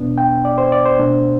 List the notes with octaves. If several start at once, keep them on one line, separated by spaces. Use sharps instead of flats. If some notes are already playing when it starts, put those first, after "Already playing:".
Already playing: E2 B2 B3 D4
G5
D5
C5
D5
C5
B2 A3 D4